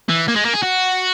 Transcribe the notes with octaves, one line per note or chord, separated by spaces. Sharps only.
E3
A#3
G#3
A#3
G#4
F#4